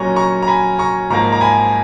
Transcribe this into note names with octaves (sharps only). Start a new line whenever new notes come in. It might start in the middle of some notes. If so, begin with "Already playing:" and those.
Already playing: A#2 F#3 C#4 G#5 A#5 C#6
A#5 C#6
A#5
G#5 B5
A#5 C#6
G#2 F3 A#3 A#5 C#6
A#5
G#5 B5